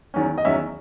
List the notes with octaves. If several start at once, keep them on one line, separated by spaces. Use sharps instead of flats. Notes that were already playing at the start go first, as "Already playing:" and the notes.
E2 D#3 F#3 C#4
D#5
E2 D#3 F#3 C#4 E5